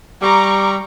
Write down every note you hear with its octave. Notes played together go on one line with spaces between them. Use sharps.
G3 A#5 C#6 D6